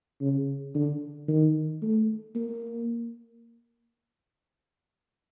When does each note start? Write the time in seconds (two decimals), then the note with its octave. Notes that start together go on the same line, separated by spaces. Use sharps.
0.21 C#3
0.75 D3
1.28 D#3
1.82 A3
2.35 A#3